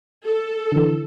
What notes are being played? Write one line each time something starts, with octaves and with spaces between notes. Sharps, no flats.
A4
D3 E3